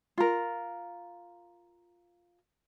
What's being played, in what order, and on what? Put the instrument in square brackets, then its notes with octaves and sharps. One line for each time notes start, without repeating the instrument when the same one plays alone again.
[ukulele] F4 A#4